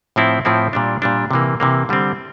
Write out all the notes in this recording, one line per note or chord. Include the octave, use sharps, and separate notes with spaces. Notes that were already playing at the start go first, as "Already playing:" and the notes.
A2 F3 C4 E4
A2 F3 C4 E4
A#2 G3 D4
A#2 G3 D4
C3 E3 A#3
C3 E3 A#3
D3 G3 C4